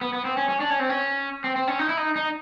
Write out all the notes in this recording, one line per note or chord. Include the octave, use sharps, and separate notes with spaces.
B3
B3
C4
C#4
C#4
D4
C#4
C4
C#4
C4
C4
C#4
D#4
E4
D#4
D#4